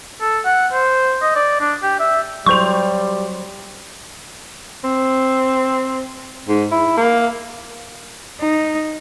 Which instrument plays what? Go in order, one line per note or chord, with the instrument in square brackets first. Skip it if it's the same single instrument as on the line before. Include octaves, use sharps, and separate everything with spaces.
[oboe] A4
F#5
C5
D#5
D5
D4
G4
E5
[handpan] F#3 C5 [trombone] G3 [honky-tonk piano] C6 G6 F7 [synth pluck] C#6
[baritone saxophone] C4
G#2
E4
A#3
[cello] D#4